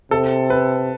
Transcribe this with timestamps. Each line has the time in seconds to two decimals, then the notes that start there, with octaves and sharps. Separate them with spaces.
0.11 C3 A4
0.50 B4